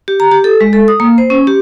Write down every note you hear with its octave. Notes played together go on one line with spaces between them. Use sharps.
G4
A#5
G4
A4
G#3
A4
D#6
A#3
C5
C#4
G4